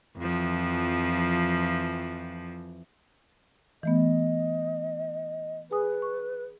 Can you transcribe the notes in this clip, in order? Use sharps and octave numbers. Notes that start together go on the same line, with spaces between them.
F2 E3 F3
E3 A3 B3 D#5
G#4 B4 G#5 D#6
C#6